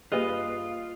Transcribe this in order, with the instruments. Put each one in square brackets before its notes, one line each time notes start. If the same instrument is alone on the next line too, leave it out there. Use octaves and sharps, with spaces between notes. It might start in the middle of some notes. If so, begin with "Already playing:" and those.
[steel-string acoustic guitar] G2 B4 F5 [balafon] A#3 G4 G#4 [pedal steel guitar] F4 [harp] D#5